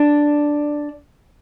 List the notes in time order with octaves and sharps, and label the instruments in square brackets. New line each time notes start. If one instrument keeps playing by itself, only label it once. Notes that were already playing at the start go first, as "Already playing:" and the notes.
Already playing: [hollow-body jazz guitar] D4